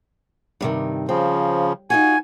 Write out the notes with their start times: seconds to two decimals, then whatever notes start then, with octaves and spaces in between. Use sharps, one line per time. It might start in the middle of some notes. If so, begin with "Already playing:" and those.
0.61 G2 C3 D#3
1.09 C#3 F3 C4
1.90 D#4 F4 F#4 G#5